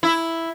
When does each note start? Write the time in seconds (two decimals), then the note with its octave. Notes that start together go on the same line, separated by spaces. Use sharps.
0.03 E4